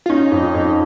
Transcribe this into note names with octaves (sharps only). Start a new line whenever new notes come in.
F4
C#4 D#4
F2
F2